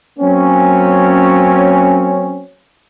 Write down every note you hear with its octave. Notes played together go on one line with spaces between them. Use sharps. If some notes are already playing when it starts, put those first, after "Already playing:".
F#3 A#3 C4 C#4